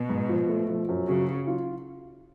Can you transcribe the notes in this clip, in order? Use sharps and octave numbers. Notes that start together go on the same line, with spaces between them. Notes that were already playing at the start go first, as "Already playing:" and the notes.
Already playing: B2
G#2
F3
A3
F3
F#2
C#3 F#3
F#3
F4